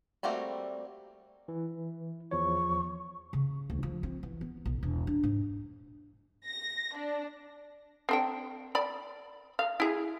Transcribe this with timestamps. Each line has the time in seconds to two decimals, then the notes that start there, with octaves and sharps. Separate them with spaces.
0.23 G3 A3 A#3 C4 F#4
1.48 E3
2.31 E2 F3 C#5 C#6
3.33 C#3
3.70 D2
3.83 F3
4.03 C4
4.23 E3
4.41 B3
4.66 B1
4.83 E1
5.07 D4
5.23 G#2
6.47 A#6
6.96 D4
8.09 C4 D4 G5
8.75 D5 B5
9.59 F5
9.80 E4 G#4